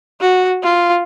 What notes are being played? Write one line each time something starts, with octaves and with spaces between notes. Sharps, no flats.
F#4
F4